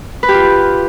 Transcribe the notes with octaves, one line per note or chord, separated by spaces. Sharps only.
B4
G4
F4